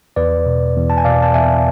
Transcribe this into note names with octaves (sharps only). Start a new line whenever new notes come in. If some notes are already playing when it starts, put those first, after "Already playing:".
E2 B4 D5
B2
E2
A5
G#5
B2 D5 F5
A5
E2 E5 G#5